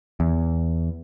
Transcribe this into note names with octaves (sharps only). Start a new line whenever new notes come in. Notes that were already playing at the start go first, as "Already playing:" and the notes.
E2